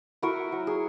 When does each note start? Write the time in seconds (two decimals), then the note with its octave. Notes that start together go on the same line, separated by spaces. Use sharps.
0.22 E4 F#4 A#4
0.52 F#3
0.67 G#4